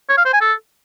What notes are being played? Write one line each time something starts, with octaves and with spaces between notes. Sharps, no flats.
C#5
F5
C5
G#5
A4